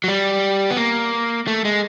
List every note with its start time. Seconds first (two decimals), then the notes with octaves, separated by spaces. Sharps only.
0.04 F#3
0.08 G3
0.70 B3
0.77 A#3
1.47 A3
1.65 G#3